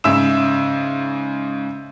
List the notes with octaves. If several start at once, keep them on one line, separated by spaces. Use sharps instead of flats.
G#2 C#3 E5 E6 E7